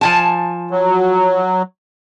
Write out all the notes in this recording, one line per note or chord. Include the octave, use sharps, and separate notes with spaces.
F3 G#5 A5
F#3